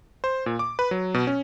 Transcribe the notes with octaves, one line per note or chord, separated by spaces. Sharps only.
C5
A#2
D6
B4
F#3
B2
C#4